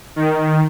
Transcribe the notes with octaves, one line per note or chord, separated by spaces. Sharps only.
D#3